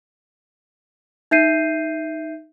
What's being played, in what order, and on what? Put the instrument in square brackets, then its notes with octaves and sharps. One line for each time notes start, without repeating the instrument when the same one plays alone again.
[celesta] D#4 E5 G6 C7 D#7